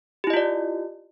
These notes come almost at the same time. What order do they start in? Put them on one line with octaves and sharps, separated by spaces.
G4 E4 D#5 F4 D5